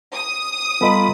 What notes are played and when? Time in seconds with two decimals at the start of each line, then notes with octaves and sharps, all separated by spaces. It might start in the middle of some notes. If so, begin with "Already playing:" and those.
0.15 D#6
0.81 G3 B3 F4 A4 D#5 A#5 B5